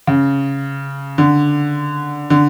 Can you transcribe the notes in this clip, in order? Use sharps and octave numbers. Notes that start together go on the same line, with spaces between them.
C#3
D3
D3